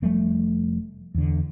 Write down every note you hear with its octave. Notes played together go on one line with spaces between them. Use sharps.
F1 F3 G3 A3
E2 D3